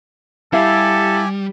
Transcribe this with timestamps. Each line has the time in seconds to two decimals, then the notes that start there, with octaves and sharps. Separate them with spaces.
0.53 G3 E4 G4 A4 F5 G#5